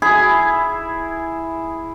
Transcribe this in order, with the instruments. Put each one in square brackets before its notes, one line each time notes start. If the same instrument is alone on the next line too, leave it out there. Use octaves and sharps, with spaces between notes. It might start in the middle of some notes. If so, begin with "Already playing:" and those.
[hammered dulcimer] E4 G#4